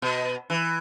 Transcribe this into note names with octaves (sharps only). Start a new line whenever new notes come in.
B2
E3